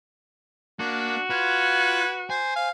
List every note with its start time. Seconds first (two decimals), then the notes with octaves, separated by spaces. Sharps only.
0.79 A#3 D4 F#4
1.30 F4 B4 G#6
2.30 C5 G#5
2.56 C5 F5